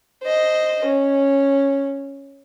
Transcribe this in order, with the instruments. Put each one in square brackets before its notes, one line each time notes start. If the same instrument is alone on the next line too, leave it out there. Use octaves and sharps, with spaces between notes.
[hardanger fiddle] C5 D#5
C#4